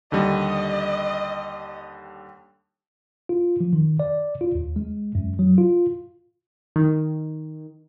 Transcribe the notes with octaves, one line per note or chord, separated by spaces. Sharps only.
D#2 D3 G3 D#5
F4
F3
D#3
D5
F4
D#2
G#3
F#2
F#3
F4
D#3